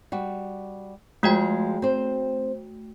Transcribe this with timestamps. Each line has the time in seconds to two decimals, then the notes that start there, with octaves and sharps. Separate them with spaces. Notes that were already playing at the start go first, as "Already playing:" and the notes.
0.12 G3 F#4
1.23 F3 G#3 A3 F4 F#4 G5
1.82 C4 C5